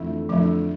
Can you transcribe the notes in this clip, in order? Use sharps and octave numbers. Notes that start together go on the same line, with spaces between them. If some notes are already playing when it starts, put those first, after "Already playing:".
Already playing: F2 D3 E3 A3 E4
F2 D3 F3 A3 E4